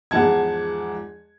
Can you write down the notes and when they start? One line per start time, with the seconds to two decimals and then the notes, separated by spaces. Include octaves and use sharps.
0.11 E2 G#2 F3 F#5 A5 G#6